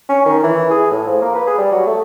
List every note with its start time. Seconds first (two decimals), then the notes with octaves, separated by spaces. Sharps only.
0.09 C#4
0.26 D#3
0.44 E3
0.71 G#4
0.91 A2
1.07 F3
1.22 A#3
1.35 B4
1.47 G#4
1.58 G3
1.72 F#3
1.87 A3